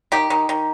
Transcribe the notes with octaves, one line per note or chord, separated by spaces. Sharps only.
D#3 G4
D#3
D#3